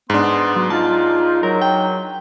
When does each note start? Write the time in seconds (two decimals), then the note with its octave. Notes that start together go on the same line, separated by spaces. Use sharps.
0.10 G#2 B3 D4 C6
0.56 F#3
0.70 D#4 F4 A5
1.43 F#3 A#4
1.62 G5